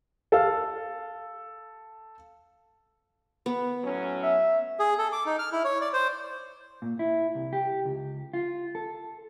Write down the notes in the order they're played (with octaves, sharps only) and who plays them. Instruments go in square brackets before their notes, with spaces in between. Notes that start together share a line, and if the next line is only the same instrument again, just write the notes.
[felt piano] A4 F5
[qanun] B3
[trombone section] A2 F#3 C#4
[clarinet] E5
[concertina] G#4
A4
D6
D#4
F6
E4
C#5
D5
C5
[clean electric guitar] A#2
E4
C2
G4
C#2
F4
A4